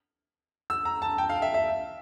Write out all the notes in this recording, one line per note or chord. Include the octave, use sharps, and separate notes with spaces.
E6
A#5
A5
G5
F5
E5
E5